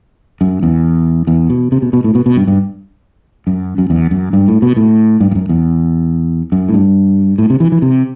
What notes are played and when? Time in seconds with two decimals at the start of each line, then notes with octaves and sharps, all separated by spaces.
0.41 F#2
0.63 E2
1.27 E2
1.50 B2
1.72 C3
1.82 B2
1.93 B2
2.04 A2
2.15 B2
2.26 B2
2.37 G2
2.47 G2
3.47 F#2
3.78 F#2
3.90 E2
4.11 F#2
4.33 G2
4.48 A2
4.62 B2
4.76 A2
5.20 G2
5.31 G2
5.35 F#2
5.49 E2
6.52 F#2
6.69 A2
6.74 G2
7.38 A2
7.50 C3
7.60 E3
7.72 E3
7.82 C3